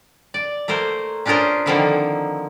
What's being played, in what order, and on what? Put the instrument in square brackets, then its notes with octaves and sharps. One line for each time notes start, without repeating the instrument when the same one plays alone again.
[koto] D5
A3 A#3 A#4 C5
C#4 D4 F4 G#4 A#4 C5
D3 D#3 F3 A#3 C4 E4